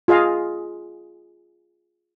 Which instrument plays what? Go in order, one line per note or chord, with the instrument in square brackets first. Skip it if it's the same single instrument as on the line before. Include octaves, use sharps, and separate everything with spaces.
[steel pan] F4 G#4 D#5 F5